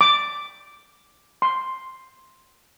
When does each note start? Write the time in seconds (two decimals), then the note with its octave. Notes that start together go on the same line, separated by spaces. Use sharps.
0.01 D6
1.42 C6